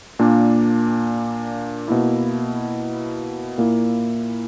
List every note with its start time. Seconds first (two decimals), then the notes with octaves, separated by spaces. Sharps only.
0.19 A#2 A#3 D4
1.88 B2 A#3 E4
3.58 A#2 A#3 E4